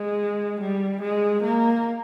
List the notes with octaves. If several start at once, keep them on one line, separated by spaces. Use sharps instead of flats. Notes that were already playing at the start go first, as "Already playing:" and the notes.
Already playing: G#3
G3
G#3
A#3